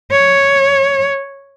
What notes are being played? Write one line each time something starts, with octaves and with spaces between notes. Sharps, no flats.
C#5